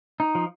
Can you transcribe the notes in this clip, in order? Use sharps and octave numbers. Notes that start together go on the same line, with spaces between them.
D#4
F3